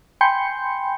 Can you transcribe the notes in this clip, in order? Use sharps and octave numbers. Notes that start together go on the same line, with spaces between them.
G5 G#5 B5 C6 G6 C#7